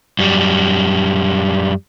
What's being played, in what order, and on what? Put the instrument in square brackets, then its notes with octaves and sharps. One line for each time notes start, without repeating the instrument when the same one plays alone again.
[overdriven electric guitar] F#2 G3